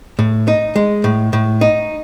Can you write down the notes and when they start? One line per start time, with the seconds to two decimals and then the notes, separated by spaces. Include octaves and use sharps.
0.19 A2
0.48 D#4
0.76 G#3
1.04 A2
1.33 A2
1.61 D#4